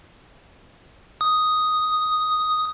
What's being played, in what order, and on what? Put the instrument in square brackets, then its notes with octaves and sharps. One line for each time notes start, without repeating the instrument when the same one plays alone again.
[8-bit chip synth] D#6